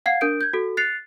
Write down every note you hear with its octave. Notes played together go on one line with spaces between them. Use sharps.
F5 F#5 G#6 C7
D4 A#4 G6 D7
G6 G#6
F#4 A4
F#6 A6 C7 C#7 F7